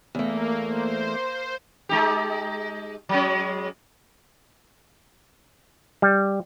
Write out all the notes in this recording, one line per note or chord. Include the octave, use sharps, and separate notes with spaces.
E2 A3 A#3
C5
C5
G#3 D#4 G4
F#3 G#3 C#4
G3